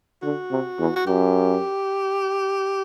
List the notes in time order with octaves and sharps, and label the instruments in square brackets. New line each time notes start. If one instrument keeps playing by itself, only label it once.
[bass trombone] D3 [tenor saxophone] F#4
[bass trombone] C3
E2
[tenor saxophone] F#4
[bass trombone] F#2 [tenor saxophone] G4